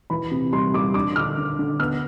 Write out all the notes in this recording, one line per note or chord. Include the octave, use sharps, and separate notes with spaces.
E3 B5
C3
G3 C6
G3 D6
D4 D6
D3 F6
D3
D3
B3 F6